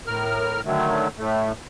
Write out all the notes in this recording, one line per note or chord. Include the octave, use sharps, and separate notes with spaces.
A2 A#4 F6
D3 D#3 F#3 A3
A2 A3